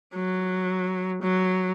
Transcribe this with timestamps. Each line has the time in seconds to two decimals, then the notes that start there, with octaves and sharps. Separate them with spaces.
0.14 F#3
1.22 F#3